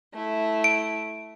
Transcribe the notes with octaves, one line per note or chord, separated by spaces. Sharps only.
A3 E4
D7